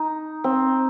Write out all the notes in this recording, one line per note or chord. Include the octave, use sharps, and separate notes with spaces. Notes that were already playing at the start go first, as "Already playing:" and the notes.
Already playing: D#4
C4